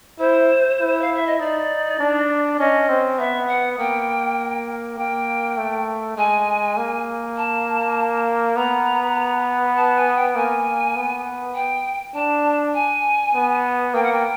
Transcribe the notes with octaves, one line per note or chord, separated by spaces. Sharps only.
E4 C5
E4
F5
E5
D#5
D#4 D5
D4
C#4 D#5
C4
B3 E5
F#5
A#3 G5
A#3 G5
A3
G#3 G#5
A#3
A5
B3 A#5
A5
G#5
G5
A#3 G#5
B3
G5
D4 A5
G#5
B3
A#3 G5
F#5
G5